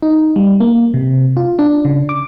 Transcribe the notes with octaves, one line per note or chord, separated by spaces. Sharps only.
D#4
G3
A#3
C3
F4
D4
C#3
D6